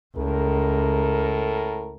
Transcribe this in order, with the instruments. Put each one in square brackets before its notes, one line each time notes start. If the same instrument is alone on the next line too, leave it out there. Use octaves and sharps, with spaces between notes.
[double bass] C#2 [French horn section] A2 A4 A#4